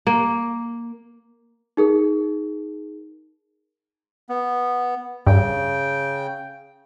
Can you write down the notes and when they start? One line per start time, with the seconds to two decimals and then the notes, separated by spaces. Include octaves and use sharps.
0.07 A#3
1.77 D#4 G#4 A#4
4.29 B3
5.27 G2 C#3 G5